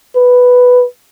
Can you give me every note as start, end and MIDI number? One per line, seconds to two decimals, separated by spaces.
0.16 0.84 71